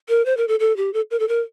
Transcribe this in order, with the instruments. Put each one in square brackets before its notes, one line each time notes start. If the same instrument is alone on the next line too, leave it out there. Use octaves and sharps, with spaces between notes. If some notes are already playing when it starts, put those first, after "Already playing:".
[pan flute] A#4
C5
A#4
A4
A4
G4
A4
A#4
A4
A#4